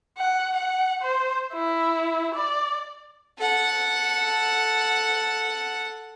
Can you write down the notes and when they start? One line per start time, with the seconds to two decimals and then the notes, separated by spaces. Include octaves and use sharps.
0.19 F#5
0.57 F#5
1.02 C5
1.54 E4
2.35 D5
3.38 A4 F#5